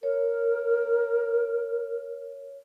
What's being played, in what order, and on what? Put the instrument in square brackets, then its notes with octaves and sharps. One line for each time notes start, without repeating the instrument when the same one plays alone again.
[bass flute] A#4 [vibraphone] C#5